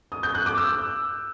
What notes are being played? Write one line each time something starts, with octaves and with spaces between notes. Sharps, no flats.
D#6
G6
F#6
D6
E6